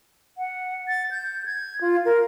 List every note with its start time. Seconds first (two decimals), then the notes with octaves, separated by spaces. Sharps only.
0.38 F#5
0.88 A6
1.11 G6
1.45 G#6
1.81 F4
2.05 A#4